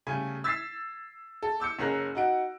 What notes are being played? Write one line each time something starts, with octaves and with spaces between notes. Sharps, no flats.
C#3 G3 A3 G#5
E6 G#6 A6 B6 C7 E7
A4
D6 E6 G6 C#7
F#1 C#4 G#4 A#4 F#6 A#6
D#4 F#4 F#5 D7